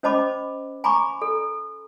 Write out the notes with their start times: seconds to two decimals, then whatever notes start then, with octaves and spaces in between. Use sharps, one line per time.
0.03 C#4 C5 D#5 A5 B5 D6
0.84 G#5 A#5 B5 C#6 D6
1.22 A4